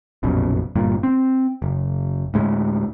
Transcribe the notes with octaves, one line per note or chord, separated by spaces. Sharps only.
F1 A#1 F#2 B2
G1 G2 A#2
C4
F#1
D2 A2 G#3